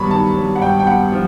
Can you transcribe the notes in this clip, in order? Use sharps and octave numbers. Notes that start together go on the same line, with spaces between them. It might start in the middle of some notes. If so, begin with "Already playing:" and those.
Already playing: G2 D#3 F#3 B3 B5 C#6
D#3 A5
F#3
F#5
G2 G5
G5
B3 F#5
F3